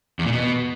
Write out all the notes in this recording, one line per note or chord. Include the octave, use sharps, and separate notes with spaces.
E2
A#2
B2